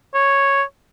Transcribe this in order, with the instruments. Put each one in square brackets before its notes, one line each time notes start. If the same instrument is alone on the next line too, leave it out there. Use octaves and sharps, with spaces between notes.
[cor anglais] C#5